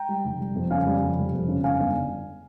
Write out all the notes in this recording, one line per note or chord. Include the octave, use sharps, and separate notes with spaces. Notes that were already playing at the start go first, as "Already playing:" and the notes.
Already playing: G5 A#5
G3
F1
G3
F2
C#3 F5 G#5
G3
F2
F1
F2
C#3
G1 F5 G#5
G1